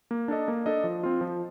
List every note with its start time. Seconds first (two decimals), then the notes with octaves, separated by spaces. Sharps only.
0.11 A#3
0.28 D4 A4 D#5
0.48 A#3
0.66 D4 A4 D#5
0.84 F3
1.03 C4 F4
1.21 F3